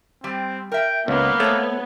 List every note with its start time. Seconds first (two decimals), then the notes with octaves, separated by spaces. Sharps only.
0.24 G3 C4
0.72 A#4 E5 G5
1.08 C#2 A#3 B3
1.40 A3 C5 C#5